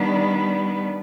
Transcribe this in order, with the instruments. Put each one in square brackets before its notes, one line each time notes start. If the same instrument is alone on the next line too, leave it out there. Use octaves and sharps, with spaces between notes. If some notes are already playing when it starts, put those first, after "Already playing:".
Already playing: [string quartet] D#3 G3 B3 D4